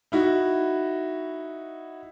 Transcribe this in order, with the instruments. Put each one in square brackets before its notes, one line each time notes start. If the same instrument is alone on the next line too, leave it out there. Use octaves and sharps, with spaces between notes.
[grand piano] D#4 E4 F#4